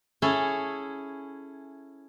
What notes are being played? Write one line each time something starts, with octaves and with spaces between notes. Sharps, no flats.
C#4 E4 G#4 A4